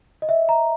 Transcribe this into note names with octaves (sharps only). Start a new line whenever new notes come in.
D#5
E5
A#5